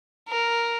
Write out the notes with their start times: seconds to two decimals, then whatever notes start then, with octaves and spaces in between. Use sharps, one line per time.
0.29 A#4